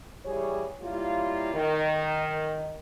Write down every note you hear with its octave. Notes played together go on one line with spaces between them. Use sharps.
E3 G3 G#4 C#5
F#3 G3 A#3 E4 F4
D#3